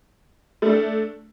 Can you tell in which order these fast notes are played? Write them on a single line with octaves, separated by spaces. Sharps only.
A3 D4 A4